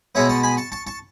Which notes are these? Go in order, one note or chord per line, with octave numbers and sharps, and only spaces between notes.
B2 G#3 B3 C#5 E5
A5 C#6
G#5 B5
A5 C#6
A5 C#6
A5 C#6